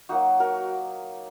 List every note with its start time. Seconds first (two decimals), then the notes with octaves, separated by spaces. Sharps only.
0.09 F#3 A#3 D#4 F#4
0.40 F#4 A#4